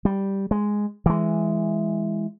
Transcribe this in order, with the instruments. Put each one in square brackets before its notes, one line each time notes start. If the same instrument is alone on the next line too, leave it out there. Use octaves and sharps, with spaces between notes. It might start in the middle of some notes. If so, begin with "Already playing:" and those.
[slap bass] G3
G#3
E3 G#3